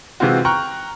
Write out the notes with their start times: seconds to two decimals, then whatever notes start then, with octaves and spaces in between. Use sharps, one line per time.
0.20 C3 E3 G#3 C4 F4 F#4
0.45 G5 A#5 C#6 F6 F#6